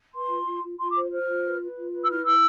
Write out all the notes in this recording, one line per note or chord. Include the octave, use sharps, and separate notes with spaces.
B4 C6
F4
F4
F4
F4 C6
D6
C5
C5 F6
F4
B4
B4
F4
B4
E6
E4 F6
E4 E6